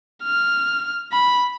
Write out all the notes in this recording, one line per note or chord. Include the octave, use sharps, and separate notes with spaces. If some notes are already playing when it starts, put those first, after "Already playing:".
F6
B5